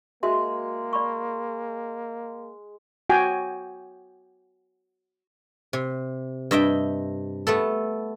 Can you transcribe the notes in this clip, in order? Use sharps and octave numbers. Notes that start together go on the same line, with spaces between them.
G#3 A#3 F#4 E5 C6
D5 B5 C#6
F#4 G5 G#5
C3
G2 D#5 E5 G5
A3 B3 A4